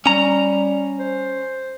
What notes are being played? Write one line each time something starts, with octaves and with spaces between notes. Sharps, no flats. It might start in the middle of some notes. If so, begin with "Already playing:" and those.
G3 C#4 A#5
C5